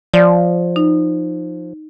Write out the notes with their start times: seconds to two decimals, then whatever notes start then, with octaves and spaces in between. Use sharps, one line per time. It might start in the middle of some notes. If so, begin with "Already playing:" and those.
0.14 F3 D5
0.76 D#4